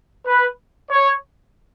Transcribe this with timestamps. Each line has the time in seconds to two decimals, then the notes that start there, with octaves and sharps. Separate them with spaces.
0.26 B4
0.91 C#5